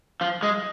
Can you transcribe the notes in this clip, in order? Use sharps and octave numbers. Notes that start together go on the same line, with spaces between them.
F3
G#3